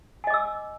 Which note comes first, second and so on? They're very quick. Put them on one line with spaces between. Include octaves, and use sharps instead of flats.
G#5 D#5 D6 E6